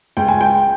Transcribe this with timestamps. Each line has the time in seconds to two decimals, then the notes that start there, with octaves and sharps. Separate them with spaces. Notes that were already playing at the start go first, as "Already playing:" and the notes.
0.17 C#2 G5
0.28 G#5
0.41 G5